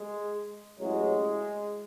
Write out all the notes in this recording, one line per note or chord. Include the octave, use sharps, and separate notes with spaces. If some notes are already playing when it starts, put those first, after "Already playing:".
Already playing: G#3
A1 A2 F#3 G#3